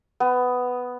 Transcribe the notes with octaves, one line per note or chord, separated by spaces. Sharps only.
B3